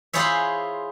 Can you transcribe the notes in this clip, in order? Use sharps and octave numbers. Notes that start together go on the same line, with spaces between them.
E4 F4 G#4 C5 C#5 E5